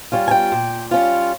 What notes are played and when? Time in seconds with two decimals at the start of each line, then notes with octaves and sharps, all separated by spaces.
0.12 G3 C#4 F4
0.28 G#5
0.31 G5
0.52 A#2
0.91 G3 C#4 F4